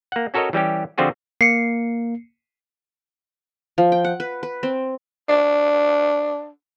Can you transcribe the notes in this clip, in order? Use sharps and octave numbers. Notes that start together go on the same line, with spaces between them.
A#3 F#5
C#4 F#4 A4 A#4 C#5 D#5
E3 G3 C#4 G4
D3 F3 C4 F4 F#4 G#4
A#3 C7 C#7
F3
G5
F#5
B4
B4
C4
D4